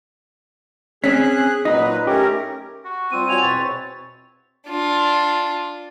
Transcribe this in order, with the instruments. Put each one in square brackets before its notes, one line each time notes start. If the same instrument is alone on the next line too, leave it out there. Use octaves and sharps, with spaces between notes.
[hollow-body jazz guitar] C4 C#4 [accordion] G#4 F#6 [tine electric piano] B6
[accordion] A#2 F#3 B4 [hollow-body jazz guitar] D#4 [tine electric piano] D#5
[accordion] A3 C#4 A#4 [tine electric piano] G4
[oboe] F#4
[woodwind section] F3 G3 F4 [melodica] C4 [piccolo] D#7
[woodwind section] F#4 C#5 [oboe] G#5 [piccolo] F7
[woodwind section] E2 B2 B4 [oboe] C#5 [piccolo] A6
[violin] D4 F4